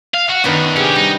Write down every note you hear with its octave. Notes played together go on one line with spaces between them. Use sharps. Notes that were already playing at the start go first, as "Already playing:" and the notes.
F5
F#4
F#2 D#3 B3 D4
C3 C#4 G4 G#4
G3 D#4